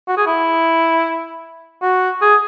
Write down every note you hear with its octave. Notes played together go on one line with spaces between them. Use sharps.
F#4
G#4
E4
F#4
G#4